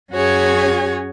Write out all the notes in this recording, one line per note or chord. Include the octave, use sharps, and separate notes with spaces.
F#2 C#4 F#4 G#4 C#5 G#5